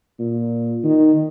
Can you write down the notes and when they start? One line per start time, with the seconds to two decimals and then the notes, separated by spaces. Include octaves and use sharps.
0.19 A#2
0.84 D#3